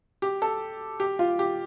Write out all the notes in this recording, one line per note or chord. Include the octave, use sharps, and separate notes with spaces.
G4
A4
G4
F4
G4